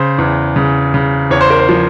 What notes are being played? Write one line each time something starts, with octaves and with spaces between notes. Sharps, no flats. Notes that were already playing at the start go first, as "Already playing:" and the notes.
Already playing: C#3 C5
E2
C#3
C#3
E2 C#5
C5
A#4
C5
F3